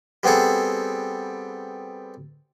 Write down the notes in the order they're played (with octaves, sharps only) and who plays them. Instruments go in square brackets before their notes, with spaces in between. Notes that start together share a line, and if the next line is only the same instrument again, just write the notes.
[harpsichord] G3 B3 C4 G#4 A4